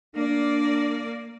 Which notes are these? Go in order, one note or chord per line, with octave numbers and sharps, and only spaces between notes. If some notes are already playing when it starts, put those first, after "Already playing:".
A#3 D4 D5